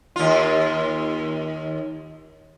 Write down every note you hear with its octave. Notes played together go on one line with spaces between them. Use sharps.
D#2 F4